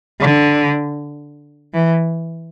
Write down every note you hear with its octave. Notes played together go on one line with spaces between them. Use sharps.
D3
E3